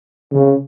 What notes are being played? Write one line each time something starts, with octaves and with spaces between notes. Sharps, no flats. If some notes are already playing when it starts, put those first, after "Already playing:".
C#3